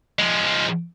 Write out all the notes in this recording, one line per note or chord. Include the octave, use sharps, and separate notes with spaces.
F3 G#3